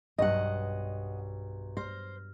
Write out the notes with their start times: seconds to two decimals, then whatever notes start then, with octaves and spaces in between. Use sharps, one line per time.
0.18 B1 G2 D#5 F#5
1.77 C5 F6 A#6